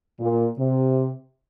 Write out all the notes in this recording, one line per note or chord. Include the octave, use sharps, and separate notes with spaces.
A#2
C3